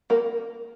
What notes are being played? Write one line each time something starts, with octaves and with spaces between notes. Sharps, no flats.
A#3 A#4